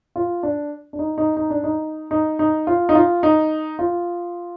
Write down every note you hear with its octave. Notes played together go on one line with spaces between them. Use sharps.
F4
D4
D4
D#4
D#4
D#4
D4
D#4
D#4
D#4
F4
D#4
F4
D#4
F4